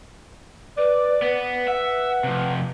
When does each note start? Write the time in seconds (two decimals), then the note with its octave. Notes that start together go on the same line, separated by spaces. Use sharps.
0.78 B4 D5
1.22 B3 B4
1.68 E5 F#5
2.24 C3 F3